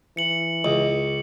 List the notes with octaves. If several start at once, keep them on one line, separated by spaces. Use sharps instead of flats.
E3 C#7 F#7
C#2 D#5